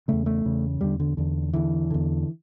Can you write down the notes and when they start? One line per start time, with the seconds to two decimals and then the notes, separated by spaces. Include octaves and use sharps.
0.08 E2 C#3 A3
0.26 A3
0.45 E2 C#3
0.81 E2 D3 G3
1.00 D3
1.17 E2 D3
1.53 E2 D3 E3
1.91 E2 D3